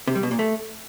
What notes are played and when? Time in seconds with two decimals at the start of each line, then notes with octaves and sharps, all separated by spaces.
0.07 C3
0.15 G3
0.23 B2
0.31 A#2
0.39 A3